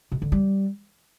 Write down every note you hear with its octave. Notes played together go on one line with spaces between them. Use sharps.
B2
D3
G3